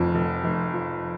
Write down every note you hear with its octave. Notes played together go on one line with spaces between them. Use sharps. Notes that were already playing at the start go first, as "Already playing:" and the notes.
Already playing: F1 F2 F3
F1
F1
F3